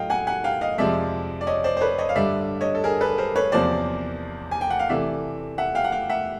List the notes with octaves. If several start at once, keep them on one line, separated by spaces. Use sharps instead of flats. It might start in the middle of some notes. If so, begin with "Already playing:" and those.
Already playing: A2 F#3 D#5 F5 G5
F#5 G#5
F#5 G#5
F5 G5
D#5 F5
F2 C3 F3 G#3 D5 E5
D5
C#5 D#5
C5 D5
C5
B4 C#5
C#5 D#5
F5
G2 D3 G3 D5 E5
C#5 D#5
A4
G#4 A#4
A4 B4
A#4 C5
B4 C#5
E2 C3 F3 A#3 C5 D5
G#5
G5
F#5
F5
C3 E3 A3 D5 E5
E5 F#5
F5 G5
F#5
F5 G5
E5 F#5